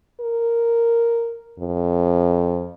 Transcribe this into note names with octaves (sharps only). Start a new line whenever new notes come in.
A#4
F2